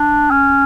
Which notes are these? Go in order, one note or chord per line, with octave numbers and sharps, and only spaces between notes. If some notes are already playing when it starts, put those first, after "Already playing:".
Already playing: D4
C#4